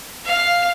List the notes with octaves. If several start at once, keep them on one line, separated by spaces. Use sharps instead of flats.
F5